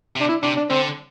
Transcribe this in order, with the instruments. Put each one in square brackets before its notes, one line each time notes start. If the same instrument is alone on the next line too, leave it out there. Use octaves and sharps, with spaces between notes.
[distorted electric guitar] C3
[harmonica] D4
E4
[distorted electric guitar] C3 [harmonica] D4
[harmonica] D4
[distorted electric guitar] D3 [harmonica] C4